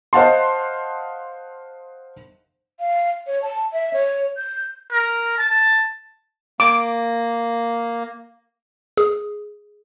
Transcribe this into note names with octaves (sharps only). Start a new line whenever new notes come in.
C5 D#5 F5 F#5 A5 C6
F5
C#5
A5
E5
C#5
G6
A#4
A5
A#3 D6
G#4